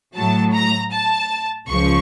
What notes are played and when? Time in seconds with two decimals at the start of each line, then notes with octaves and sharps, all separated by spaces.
0.15 A2 F#3 A5
0.54 A#5
0.92 A5
1.69 C#2 C#3 F3 C#6